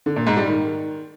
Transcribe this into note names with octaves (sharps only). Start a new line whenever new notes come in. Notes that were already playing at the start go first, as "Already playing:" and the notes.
D3
A#2
G#2
G3
D#3